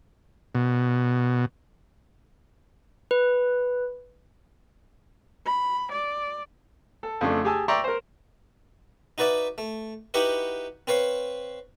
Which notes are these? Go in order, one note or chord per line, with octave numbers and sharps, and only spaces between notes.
B2
B4
B5
D5
A4
F2 C#3 A3 D4
G4 G#4 G#5 A5 E6
D5 E5 G5 A#5 C6 C#6
A#4 C5
D#4 F#4 B4 D5 E5
A3
D#4 E4 F#4 G4 B4 F#5
C4 B4 C#5 F5